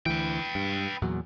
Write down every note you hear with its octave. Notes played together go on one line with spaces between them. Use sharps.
D2 E3 B4 G5
G2
E2 A#2 F#3